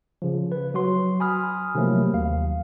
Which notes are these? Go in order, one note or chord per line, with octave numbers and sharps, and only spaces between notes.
C#3 F3
B4
F#3 F#4 C6
G#5 B5 D#6 F6
C3 D#3 F3 F#3 A3 A#3
D#2 F5